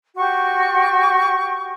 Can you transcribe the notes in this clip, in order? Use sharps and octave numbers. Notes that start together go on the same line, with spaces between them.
F#4 G4 C#6